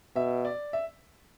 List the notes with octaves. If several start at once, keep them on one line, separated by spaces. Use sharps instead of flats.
B2 E5
D5
E5